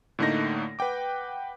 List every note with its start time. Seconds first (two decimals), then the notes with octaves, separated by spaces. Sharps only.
0.19 A2 D3 A3 A#3 D#4 A#6
0.79 B4 F#5 G5 D6